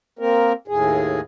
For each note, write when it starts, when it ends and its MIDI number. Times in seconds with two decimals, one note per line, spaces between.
0.19 0.53 58
0.19 0.53 60
0.19 0.53 70
0.68 1.20 39
0.68 1.20 45
0.68 1.20 68